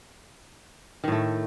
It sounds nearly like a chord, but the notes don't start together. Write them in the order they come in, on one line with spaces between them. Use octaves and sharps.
D#3 A2 A3